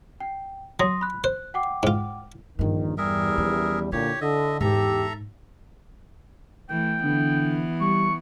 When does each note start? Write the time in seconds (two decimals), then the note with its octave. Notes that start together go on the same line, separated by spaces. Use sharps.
0.20 G5
0.80 F#3 C6 D#6 A#6
1.01 B5 F#6
1.24 C5 F#6
1.54 F#5 G5 D6
1.83 G#2 F4
2.59 A#1 G2 D#3 E3
2.98 E2 G3 G#4 A#4 E5
3.38 F3 C#4
3.92 A#2 D3 E4 G4 C#5
4.21 D3 D#5 E5
4.61 E2 G#2 G4 A4 E5 A#5
6.70 E3 A3 G5
7.04 D3 E3 B3
7.81 G3 C#6